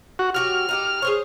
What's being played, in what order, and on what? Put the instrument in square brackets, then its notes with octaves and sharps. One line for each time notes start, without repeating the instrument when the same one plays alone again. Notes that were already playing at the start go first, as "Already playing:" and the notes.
[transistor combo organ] F#4
[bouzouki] F#3 F#4 G4 [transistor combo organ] F6
[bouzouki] D#4 F#4 G4
G#4 C5 C#5